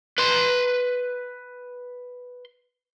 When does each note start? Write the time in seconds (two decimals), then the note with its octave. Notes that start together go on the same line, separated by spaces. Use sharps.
0.18 B4 C6